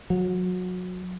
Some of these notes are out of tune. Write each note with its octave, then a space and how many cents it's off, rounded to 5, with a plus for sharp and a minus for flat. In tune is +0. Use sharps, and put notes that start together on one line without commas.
F#3 -25